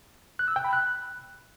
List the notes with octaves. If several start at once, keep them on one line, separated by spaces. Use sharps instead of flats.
F#6
E6
G5
B5
F#6